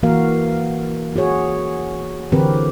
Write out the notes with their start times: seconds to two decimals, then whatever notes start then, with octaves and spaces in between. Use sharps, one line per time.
0.03 E3 A#3 F#4 A#4 F5
1.16 F#4 G#4 C#5
2.32 D3 E3 C4 G4 A#4 B4